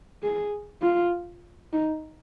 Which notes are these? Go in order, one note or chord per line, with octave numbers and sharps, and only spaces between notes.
G#4
F4
D#4